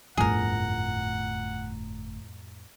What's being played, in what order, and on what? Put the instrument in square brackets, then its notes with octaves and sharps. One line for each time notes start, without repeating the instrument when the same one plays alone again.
[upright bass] G1 A3 [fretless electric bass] F2 A2 F3 [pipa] G#4 A#4 [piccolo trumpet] F#5